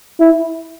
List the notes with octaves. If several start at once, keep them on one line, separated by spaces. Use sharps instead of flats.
E4